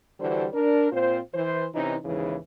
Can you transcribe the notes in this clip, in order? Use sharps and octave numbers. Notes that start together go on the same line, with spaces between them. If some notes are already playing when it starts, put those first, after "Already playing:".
D3 E3 G3 D4 F#4 C5
D4 A#4
A#2 C4 F4 C5
E3 C5
C3 E3 C#4 D#4
D#2 G#2 C#3 E3